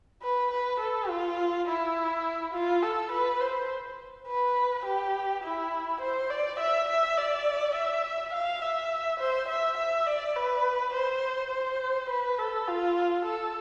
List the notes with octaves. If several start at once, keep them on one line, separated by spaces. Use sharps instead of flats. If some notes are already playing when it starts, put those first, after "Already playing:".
B4
B4
A4
F4
E4
F4
A4
B4
C5
B4
G4
E4
C5
D5
E5
E5
D5
E5
F5
E5
C5
E5
E5
D5
B4
C5
C5
B4
A4
F4
A4